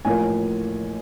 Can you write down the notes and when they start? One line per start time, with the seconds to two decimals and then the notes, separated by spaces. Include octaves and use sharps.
0.05 A1 A2 F3 A#3 G#5